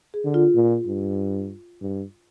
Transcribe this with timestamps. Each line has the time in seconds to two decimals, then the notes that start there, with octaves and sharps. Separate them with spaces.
0.14 G#4
0.24 D3
0.34 F4
0.55 A#2
0.87 G2
1.82 G2